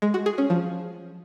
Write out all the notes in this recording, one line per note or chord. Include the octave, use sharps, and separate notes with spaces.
G#3
F#4
G#4
C#4
F3